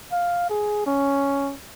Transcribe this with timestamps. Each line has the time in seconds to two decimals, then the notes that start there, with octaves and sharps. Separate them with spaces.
0.12 F5
0.50 G#4
0.86 C#4